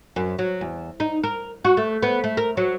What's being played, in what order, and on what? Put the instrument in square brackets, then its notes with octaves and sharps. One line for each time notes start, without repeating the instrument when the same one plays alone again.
[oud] F#2
F#3
E2
D#4
A#4
F#4
A3
B3
A3
A#4
F#3